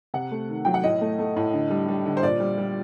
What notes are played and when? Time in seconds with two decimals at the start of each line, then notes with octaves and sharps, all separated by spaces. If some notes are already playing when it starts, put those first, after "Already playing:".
0.14 C3 F#5
0.32 A3
0.49 D#3
0.65 F#3 G5
0.74 F#5
0.83 A2 D#5
1.01 A3
1.19 A3
1.36 A2
1.53 D3
1.70 G3
1.88 G3
2.06 D3
2.17 C5
2.23 A#2 D5
2.40 G3
2.58 G3